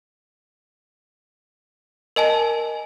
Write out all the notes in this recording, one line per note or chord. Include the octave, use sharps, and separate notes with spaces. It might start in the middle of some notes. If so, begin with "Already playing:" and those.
A#4 D#5 G#5 A5